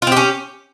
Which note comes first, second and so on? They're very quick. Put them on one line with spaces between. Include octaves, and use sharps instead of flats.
F4 C4 G4 C#4